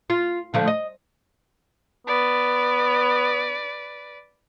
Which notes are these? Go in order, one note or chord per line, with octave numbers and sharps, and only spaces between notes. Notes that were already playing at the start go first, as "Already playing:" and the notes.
F4
D3 F3 A3
D#5
B3 B4 D5